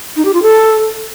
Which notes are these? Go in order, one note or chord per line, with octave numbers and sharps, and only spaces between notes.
D#4
G4
F4
A4